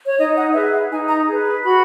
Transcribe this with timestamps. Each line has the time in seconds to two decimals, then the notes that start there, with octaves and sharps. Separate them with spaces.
0.06 C#5
0.17 D#4 D#5
0.35 F#5
0.53 G#4 B4 E5
0.72 F#5
0.90 D#4 G#5
1.08 A#5
1.26 G#4 B4
1.63 F#4 B5